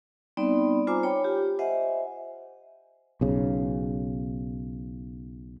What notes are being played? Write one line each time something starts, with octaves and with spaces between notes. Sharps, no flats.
G3 B3 C4 D#4 D5 B5
C4 F4 C5 G#5 A#5 D6
C#5 G5 B5
F4 G4
C5 D#5 E5 F#5 G#5
B1 C#3